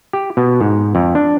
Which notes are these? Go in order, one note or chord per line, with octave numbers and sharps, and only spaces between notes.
G4
B2
G#2
F2
D4